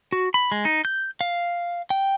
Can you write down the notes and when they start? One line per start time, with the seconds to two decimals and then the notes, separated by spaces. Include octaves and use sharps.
0.12 F#4
0.34 B5
0.52 G#3
0.65 D#4
0.85 G6
1.21 F5
1.90 G5